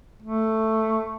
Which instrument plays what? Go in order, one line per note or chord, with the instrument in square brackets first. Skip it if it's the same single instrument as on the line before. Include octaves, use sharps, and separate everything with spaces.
[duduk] A3